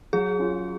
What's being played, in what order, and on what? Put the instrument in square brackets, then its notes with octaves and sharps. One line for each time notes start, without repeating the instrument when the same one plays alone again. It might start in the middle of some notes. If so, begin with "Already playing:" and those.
[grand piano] F#3 [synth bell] G#4
[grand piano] C#4 F4